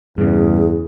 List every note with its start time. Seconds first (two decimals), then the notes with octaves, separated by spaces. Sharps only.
0.18 E2 G2 C#3 G#4